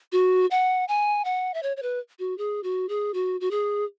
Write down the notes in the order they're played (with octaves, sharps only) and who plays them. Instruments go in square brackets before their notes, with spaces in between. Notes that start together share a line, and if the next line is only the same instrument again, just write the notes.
[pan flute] F#4
F#5
G#5
F#5
E5
C#5
C#5
B4
F#4
G#4
F#4
G#4
F#4
F#4
G#4